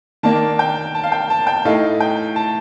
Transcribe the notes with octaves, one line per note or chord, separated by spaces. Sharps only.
D#3 A#3 D4 A5
G5
A5
F5
G5
A5
G5
A2 A3 D#4 F5
G5
A5